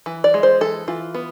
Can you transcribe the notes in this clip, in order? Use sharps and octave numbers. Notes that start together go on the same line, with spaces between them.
E3
D5
G#3
C5
E3 A4
E3 F4
B3